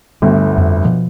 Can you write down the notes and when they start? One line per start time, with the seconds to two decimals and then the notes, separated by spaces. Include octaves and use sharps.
0.22 G1 D2 G3
0.58 F2
0.84 B2 F3